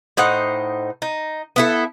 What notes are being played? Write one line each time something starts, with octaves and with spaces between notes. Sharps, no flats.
A2 D#4 C5 F#5
D#4
B3 E4 A4